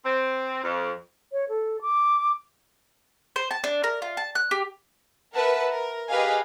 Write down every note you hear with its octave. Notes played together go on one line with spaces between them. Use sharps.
C4
F2
C#5
A4
D6
C5
A5
D4
A#4
F4
A5
F#6
G4
A#4 B4 E5 F#5 A5
A#4
G4 G#4 B4 D#5 F5 G#5